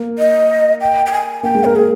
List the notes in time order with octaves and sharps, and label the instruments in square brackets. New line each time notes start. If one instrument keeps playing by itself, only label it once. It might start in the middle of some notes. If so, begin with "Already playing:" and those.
Already playing: [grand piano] A#3
[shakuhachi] D#5
G5
G5
G#5
[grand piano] A#3 [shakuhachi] G5
[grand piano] G#3
[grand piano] A#3 [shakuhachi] A#4
[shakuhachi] G#4